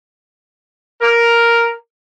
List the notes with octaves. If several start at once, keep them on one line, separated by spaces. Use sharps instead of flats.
A#4